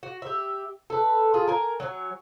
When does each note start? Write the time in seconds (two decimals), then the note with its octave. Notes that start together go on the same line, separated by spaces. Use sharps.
0.03 F#4
0.22 G4 E5
0.90 A4 B4
1.34 F4 G#4
1.48 A#4 G#5
1.80 F#3 C#5 G#5